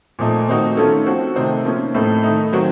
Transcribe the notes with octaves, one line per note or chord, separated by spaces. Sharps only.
A#2 F3 A3 D#4
D#3 A3 C4 D#4 F#4
D#3 A3 C#4 F4 A4
F3 C4 F#4
C3 D#3 A3 C4 D#4
F3 A#3 C#4
A2 A3 C4 D#4 A4
D#3 A3 D#4
D#3 F#3 C4 F#4